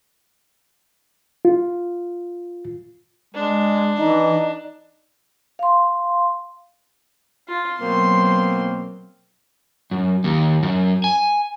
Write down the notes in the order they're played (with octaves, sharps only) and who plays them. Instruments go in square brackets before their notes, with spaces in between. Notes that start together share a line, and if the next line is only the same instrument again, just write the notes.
[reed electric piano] F4
[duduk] G#3 [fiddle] D4
[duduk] E3 [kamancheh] D#4
[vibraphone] F5 C6
[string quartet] F4
[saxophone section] B2 A#3 C4 [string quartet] F#3 C6
[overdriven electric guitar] F#2
D#2
F#2
G#5